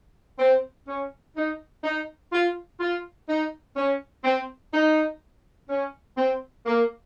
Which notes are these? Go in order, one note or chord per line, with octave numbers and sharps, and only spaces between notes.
C4
C#4
D#4
D#4
F4
F4
D#4
C#4
C4
D#4
C#4
C4
A#3